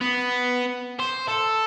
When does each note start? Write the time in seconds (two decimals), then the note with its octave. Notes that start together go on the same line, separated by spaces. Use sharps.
0.01 B3
0.99 C5
1.28 A4